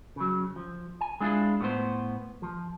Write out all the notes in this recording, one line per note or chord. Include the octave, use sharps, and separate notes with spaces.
C#3 F#3
F3
G#5
G#3 D4 E4 F4
A2 B3 C5
F3